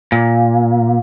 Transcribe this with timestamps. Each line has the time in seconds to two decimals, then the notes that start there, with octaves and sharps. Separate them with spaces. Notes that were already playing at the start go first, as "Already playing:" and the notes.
0.12 A#2